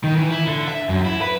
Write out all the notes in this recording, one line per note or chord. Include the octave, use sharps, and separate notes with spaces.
D#3
E3
E4
D3
E5
F#2
E4
B4